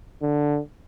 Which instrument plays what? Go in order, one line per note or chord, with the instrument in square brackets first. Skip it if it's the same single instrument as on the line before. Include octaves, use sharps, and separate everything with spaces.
[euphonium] D3